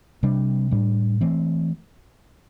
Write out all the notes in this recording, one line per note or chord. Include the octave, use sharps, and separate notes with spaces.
C3 G3 D4
A2 G3 D4
E3 A3 C4